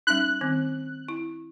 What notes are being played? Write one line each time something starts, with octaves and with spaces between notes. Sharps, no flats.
G3 C#4 D#4 F#6
D#3 C4
E4